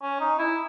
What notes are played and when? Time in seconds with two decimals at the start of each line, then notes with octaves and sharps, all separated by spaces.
0.02 C#4
0.20 D#4
0.39 E4